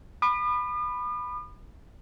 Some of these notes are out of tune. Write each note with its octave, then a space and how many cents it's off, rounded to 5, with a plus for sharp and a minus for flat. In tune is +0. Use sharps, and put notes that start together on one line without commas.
B5 +5 D#6 -45